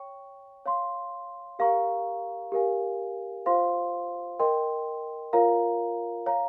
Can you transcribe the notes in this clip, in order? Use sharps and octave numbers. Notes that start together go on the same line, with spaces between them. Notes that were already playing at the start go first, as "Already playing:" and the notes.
Already playing: C#5 G5 C#6
C#5 F5 C6
G4 A#4 F5 A#5 C#6
G4 A#4 F5 G#5
F4 C5 F5 C6
A#4 D#5 G5 C6
F4 A#4 C#5 F5 A#5
C#5 F5 A#5